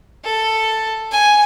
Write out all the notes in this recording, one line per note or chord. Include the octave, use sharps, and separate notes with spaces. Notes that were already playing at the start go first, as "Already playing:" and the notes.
A4
G#5